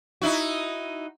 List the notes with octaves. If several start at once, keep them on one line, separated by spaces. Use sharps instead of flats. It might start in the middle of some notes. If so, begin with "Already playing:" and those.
D#4 E4 F#4